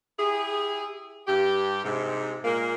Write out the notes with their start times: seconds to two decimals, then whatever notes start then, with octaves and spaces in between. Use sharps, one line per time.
0.19 E4 G4 G#4
1.27 G2 G4
1.83 G#2 C3
2.44 A#2 G#3 A#3